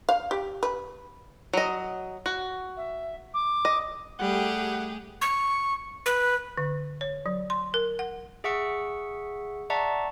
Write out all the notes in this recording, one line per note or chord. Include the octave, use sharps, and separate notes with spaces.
F5
G4
B4
F#3 D#5
F#4
E5
D6
D#5
G3 A3 G4 G#4 F#5
C#6
B4
D3
C#5
F#3
C6
A#4
F#5
G#4 E5 F#5 C#6 E6 C#7
D5 E5 F#5 A5 A#5 C#6